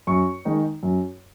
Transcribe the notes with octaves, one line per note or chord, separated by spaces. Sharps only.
F#2 C#6
D#3 G#3 D#4
F#2